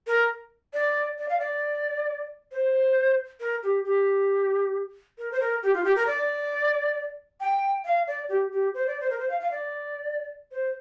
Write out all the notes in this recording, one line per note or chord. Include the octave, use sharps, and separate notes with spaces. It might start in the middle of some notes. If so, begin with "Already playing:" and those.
A#4
D5
D5
F5
D5
C5
A#4
G4
G4
A#4
C5
A#4
G4
F4
G4
A#4
D5
G5
F5
D5
G4
G4
C5
D5
C5
A#4
C5
F5
F5
D5
C5